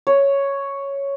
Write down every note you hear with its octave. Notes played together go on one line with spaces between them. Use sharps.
C#5